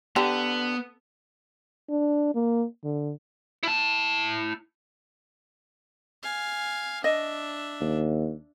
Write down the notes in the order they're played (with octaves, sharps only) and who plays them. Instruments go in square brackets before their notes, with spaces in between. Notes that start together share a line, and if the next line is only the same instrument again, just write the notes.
[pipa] D3 [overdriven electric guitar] B3 [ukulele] G4 G5 A#5
[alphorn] D4
A#3
D3
[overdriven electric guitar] E4 A5
[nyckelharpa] F5 G#5
[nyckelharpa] D4 E5 [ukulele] D#5
[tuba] D#2